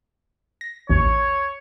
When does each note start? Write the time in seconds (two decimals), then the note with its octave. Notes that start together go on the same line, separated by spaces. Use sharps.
0.61 A#6
0.89 A1 D#2 C#5